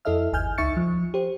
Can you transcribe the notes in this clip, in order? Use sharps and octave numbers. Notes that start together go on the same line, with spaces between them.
F2 E4 A4 D#5 E5 F6
G1 D#2 G#5 F6 G6
C#2 D#4 E5 C#6 A6 C#7
F3
G4 C5